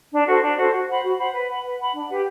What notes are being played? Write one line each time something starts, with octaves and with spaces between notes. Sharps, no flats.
D4
F#4 A4 C5
D4
F#4 A4 C5
F#4
C5 F#5 B5
F#4
C5 F#5 B5
B4
F#5 B5
B4
F#5 B5
D4
G4 B4 F#5